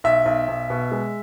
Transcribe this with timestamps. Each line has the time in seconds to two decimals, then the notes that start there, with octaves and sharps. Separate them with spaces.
0.04 B1 E5
0.26 B1
0.48 B1
0.70 B2
0.92 G#3